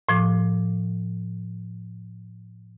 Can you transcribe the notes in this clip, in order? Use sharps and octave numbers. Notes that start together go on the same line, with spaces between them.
A2 F3 D6